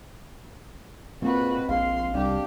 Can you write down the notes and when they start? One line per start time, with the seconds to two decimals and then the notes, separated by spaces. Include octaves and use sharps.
1.22 A#2 G#3 C4 F#4 B4
1.69 A#1 F5 C6
2.14 C2 D4 G4